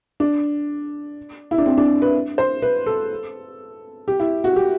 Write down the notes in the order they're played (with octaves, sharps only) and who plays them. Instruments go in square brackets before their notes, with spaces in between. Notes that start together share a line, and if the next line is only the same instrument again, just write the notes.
[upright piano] D4
E4
D4
C4
D4
B4
C5
B4
A4
G4
E4
F#4
G4